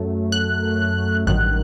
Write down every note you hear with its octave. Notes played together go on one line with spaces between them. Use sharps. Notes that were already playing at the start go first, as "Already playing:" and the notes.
Already playing: F#2 F#3 A3
F#6
A1 G2 D#3 F#3 F#6